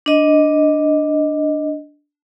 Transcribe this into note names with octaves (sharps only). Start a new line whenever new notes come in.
D4 D#5